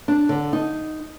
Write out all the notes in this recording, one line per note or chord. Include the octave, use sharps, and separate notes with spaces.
D4
D3
D#4